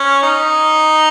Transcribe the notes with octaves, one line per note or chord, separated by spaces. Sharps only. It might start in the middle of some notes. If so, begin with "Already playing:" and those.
Already playing: C#4
D#4